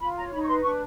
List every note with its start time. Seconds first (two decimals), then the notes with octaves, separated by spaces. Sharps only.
0.01 F4 B5
0.17 C#5 A#5
0.33 D#4 B5
0.43 C#6
0.48 B4 C6
0.64 D4 C#6